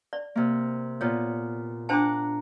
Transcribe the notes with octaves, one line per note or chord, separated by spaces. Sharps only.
D5
C3 A#3
A#2 B3 C#5
D4 C5 F#5 A5 A#5 D6